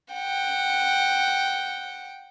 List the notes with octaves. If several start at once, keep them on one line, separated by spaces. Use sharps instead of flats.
F#5 G5